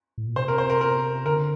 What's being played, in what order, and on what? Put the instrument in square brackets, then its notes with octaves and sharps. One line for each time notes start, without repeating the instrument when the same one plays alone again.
[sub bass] A2
A#2
[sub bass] C3 [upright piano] C5
[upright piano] A#4
C5
A#4
A#4
[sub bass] D3 [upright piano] A#4